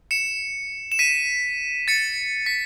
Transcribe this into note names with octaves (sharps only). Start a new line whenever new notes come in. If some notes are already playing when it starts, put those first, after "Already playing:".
C#7 E7
E7
B6 D#7
A6 C#7
B6